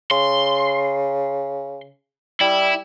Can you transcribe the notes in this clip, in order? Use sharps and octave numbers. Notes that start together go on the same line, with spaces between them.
C#3 C6
G3 E4